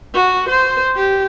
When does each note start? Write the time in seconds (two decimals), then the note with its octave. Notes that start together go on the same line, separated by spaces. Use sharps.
0.15 F#4
0.49 C5
0.96 G4